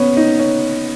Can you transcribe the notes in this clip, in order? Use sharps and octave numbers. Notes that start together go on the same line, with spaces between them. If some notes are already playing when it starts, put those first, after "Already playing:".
Already playing: B3 C#4
D#4
C#4